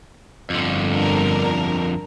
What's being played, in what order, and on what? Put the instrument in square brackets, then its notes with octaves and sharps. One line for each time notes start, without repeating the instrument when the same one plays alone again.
[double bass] G1 [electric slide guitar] F2 D3
[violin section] D4 A#4